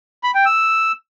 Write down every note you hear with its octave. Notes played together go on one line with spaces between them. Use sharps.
B5
G5
E6